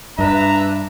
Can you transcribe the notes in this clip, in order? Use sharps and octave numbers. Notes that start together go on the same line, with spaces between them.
G2 D4 B4 E5 A#5